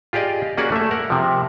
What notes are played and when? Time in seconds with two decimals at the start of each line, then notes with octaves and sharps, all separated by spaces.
0.13 F4 G4 G#4 D5 D#5
0.58 A#3 C#4 F#4 G#4 D5 F#5
0.72 A3 E5
0.91 A#4 F#5
1.10 C3 F3